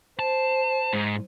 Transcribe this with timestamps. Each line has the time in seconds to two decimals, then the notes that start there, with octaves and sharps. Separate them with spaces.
0.19 C5 A5
0.93 G#2